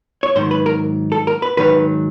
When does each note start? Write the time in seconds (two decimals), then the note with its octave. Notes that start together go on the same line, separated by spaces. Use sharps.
0.23 C#5
0.35 G#2 D#3 F#3 C5
0.51 B4
0.66 A#4
1.12 A4
1.27 A#4
1.42 B4
1.57 G#2 D#3 F#3 B4